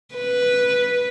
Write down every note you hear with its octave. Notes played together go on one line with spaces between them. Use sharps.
B4